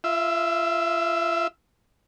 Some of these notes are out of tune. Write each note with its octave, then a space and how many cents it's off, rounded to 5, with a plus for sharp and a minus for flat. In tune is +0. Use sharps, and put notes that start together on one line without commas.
F4 -30 E5 +0